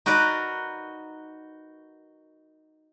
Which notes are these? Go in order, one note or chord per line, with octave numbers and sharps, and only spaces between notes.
D#4 F#4 A#4 B4 D5